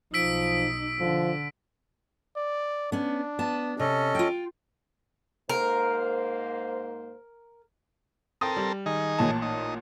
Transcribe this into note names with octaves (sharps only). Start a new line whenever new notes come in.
B1 F3 D#4 E6 B6 D7
D3 F3
D5
B3 C#4 D4
B3 A5
C3 C#4 A4 D#5
F4 G5
G#2 A#3 A#4 C5
C4 A4 A#4 G5 D#6
G3
D#3 D#4 G#4
A1 A#2 A5
D#4